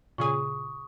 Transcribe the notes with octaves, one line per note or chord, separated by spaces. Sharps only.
A#2 C#3 G#4 C#6 D#6